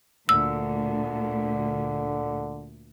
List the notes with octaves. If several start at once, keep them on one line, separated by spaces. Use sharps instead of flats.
D2 A#2 D3 E6